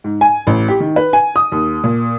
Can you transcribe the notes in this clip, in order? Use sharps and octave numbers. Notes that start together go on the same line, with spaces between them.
G#2
G#5
A1
G4
D#3
B4
G#5
D#6
D#2
A#2